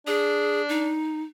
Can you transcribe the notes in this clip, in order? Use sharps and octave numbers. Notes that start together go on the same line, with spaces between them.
D4 G#4
D#4